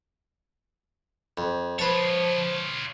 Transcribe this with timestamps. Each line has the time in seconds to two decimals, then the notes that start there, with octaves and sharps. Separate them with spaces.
1.38 F2
1.79 F3 F4 B4 C#5 A5